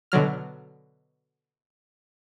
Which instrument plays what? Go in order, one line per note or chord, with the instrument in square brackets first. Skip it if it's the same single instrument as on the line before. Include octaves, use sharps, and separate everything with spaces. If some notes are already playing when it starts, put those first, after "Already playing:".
[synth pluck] B2 D3 F#3 F6